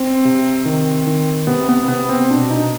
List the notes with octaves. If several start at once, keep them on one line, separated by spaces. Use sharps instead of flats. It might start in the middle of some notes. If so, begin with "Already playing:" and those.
Already playing: C4
C3
D#3
D#3
C3 B3
B3
C3 B3
C4
B2 D4
D#4